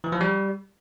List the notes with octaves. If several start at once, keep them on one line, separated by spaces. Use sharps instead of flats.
E3
F3
G3